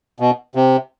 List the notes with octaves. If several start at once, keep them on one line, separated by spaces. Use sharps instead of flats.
B2
C3